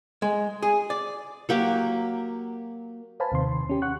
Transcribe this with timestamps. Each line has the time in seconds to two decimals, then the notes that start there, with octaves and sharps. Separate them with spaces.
0.22 G#3
0.62 G#4
0.90 D5
1.49 F#3 A#3 G4
3.20 B4 C5 F5 G#5 A5 B5
3.32 D#2 C3 D#3 C6
3.69 C#4 G4
3.82 F#5 C#6 F#6